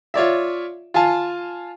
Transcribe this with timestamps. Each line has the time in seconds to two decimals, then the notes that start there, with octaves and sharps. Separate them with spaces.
0.14 F4 C#5 D5 E5
0.94 F4 F5 G#5 A5